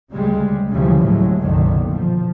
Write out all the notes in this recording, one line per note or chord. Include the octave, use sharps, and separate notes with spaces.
D2 C#3 G3 G#3
D2 C#3 E3 F3 G3
A2 F#3 G#3
F#1 B1 A#2 D3 D#3
F3